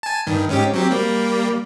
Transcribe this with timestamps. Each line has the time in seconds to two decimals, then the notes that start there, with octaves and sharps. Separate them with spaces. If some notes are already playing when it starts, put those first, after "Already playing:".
0.03 G#5 A5
0.27 G2 D#3
0.49 G#2 C#4 G4
0.73 F#3 C4 G4
0.91 G3 A#3